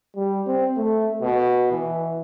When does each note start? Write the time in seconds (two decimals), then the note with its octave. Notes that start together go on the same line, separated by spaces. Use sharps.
0.16 G3
0.46 C4
0.77 A3
1.22 B2
1.72 E3